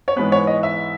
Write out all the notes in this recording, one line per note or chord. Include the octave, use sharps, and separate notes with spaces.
C#5
G#2 E3 G#3 B3 B4
C#5
D#5
E5